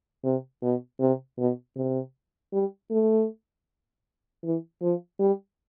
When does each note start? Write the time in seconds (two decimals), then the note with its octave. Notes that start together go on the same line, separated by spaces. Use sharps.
0.24 C3
0.62 B2
1.00 C3
1.38 B2
1.76 C3
2.53 G3
2.91 A3
4.44 E3
4.82 F3
5.20 G3